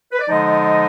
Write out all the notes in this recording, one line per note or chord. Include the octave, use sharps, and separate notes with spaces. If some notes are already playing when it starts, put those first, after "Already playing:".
B4
D5
D3 F3 G#3 D#4 D#5